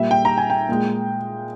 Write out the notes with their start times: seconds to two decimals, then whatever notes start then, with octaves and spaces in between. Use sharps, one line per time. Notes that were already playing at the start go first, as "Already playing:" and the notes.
Already playing: A#2 G3 E5
0.11 G5
0.25 A#5
0.38 G#5
0.50 G5
0.69 A#2 G#3